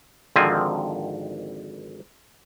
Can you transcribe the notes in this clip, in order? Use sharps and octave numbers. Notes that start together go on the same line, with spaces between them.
G#1 D3 D#3 F3 C4 G#5